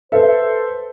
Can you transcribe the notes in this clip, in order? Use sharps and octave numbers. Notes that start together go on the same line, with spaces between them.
A4 B4 C5 E5